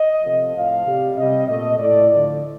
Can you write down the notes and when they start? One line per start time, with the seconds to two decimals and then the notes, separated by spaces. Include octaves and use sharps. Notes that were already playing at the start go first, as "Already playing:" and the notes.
Already playing: D#5
0.23 C3 F3 A3
0.54 A2 F3 A3 F5
0.86 C3 G3
1.16 C3 G3 D#5
1.47 A#2 A3 D#5
1.78 A2 A3 D5
2.09 D3 F3 A3 D5